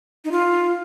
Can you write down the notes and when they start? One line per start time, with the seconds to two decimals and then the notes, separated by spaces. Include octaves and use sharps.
0.25 D#4
0.31 F4